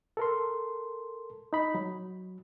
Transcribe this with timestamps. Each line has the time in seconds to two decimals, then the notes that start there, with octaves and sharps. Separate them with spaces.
0.17 A4 A#4 C6
1.53 D#4 B5
1.75 F#3